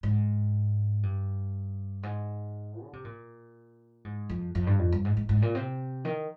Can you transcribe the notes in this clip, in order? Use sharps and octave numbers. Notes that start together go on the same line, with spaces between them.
G#2
G2
G#2
D3
C3
A#2
G#2
F2
F2
G2
F2
G2
G#2
G#2
G#2
A#2
C3
D#3